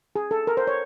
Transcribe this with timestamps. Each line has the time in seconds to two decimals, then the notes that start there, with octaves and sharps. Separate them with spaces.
0.16 G#4
0.31 A4
0.47 A#4
0.57 C5
0.67 C#5